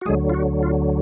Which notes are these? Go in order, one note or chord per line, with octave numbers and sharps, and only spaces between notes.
F#4
D2 D3 F#3 G#3 G#4
F4
F#4
F4